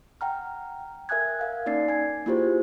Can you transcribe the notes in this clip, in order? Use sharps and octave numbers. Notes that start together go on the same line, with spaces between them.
F#5 G5 A#5 F6
A#4 E5 G#5 D#6 F#6 G#6
A#4 F5 F#5
A#3 C#4 D#4 D5 A6 C7
G#5 G#6
A#3 E4 F4 G4 G#4 C5